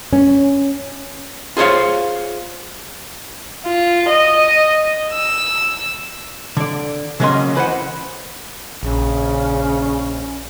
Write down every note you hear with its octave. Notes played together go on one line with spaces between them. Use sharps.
C#4
F4 G#4 C5 C#5 F5
F4
D#5
E6
D3 D5
C#3 F#3 A#3 C#4 D#5 C6
E3 B4 C5 F#5
A#1 C#3 C#4